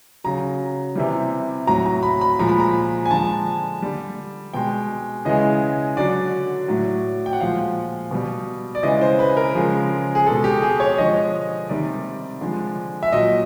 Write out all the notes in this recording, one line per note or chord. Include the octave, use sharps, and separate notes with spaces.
C#3 F#3 A#5
C3 E3 G3
A2 F#3 A#5
A#5
B5
B5
A#2 F3 G#3 A#5
B5
A#5
G#5
D3 F3 G#3 A5
D3 G3
B2 G#3 G5
C#3 E3 G#3 D#5
D3 F#3 D5
A2 F#3
G5
F#5
A#2 F3 G#3 F5
B2 G3
D5
C#3 E3 G#3 D#5
C5
B4
A#4
C#3 F3 G#3
G#4
B2 G#3 A4
G4
G#4
C#5
D3 F3 G#3 D#5
C3 D#3 G3 D5
D3 F3 G#3
E5
A#2 F#3 D#5